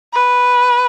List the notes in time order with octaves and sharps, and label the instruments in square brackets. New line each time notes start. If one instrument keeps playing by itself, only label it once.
[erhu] B4